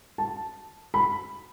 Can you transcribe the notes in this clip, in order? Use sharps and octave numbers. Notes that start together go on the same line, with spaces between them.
A5
B5